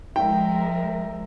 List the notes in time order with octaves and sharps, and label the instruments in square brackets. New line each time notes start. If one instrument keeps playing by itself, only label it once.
[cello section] F3 G#3 A#4 [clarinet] E5 [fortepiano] G5